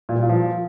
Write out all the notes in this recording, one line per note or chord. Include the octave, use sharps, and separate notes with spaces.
A#2
G3
A#2
F3